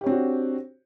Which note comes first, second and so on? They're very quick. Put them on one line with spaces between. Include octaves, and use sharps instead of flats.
G4 C#5 C4 D4 F#4